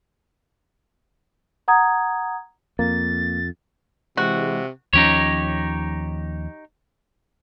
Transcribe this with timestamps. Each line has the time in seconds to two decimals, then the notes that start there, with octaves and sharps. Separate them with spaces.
1.68 F#5 A#5 D#6 G#6
2.79 F2 A#3 A6
4.17 C3 E3 G#3 F#4
4.93 D#2 F3 C#4 D#4 G4 C#5